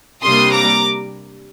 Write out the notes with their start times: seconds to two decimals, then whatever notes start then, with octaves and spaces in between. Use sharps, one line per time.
0.23 C3 G3 A#3 D4 C6 D#6
0.52 A#5 D6